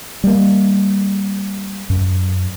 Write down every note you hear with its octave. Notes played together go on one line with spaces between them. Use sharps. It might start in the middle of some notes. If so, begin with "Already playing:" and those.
G3 A#3
F#2